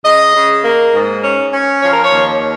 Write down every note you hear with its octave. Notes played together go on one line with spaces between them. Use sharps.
C#3 D#5
C#3
A#3
G#2
C#4
C#4
F3 C#5
A#4
C#5
D#2